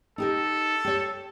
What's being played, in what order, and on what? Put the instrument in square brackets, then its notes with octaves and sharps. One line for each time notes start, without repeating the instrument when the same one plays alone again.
[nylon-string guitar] D#4 G4 A#4 [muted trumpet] A4
[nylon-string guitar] G4 C#5